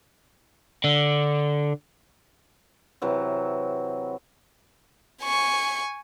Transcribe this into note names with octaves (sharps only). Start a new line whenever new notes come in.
D3
C3 E3 F#3
G#5 C#6